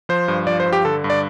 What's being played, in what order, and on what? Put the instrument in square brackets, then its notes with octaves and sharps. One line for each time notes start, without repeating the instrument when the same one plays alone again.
[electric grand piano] F3 C5
G2
F3 D5
C5
G2
G4
D3 A4
G2
D5